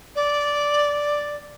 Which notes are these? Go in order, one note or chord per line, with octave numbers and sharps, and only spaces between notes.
D5